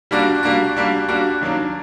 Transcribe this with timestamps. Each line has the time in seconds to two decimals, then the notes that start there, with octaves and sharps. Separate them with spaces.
0.11 G3 A#3 D4 F#4
0.43 G3 A#3 D4 F#4
0.77 G3 A#3 D4 F#4
1.09 G3 A#3 D4 F#4
1.41 D#3 F#3 A#3 D4